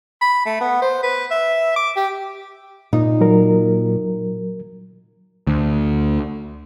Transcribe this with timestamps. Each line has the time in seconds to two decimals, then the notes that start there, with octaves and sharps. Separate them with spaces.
0.21 B5
0.46 A3
0.61 B3
0.82 C5
1.03 B4
1.31 E5
1.76 D6
1.96 G4
2.93 A#2 D#4
3.21 F#3 A#4
5.47 D2